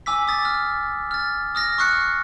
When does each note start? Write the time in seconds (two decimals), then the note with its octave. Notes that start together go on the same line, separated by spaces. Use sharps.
0.06 G#5 D6 E6 B6
0.28 D#6 A6
0.45 F6
1.11 F6 A6
1.55 D#6 F6 A#6
1.78 C#6 D#6 F6 F#6 C7 C#7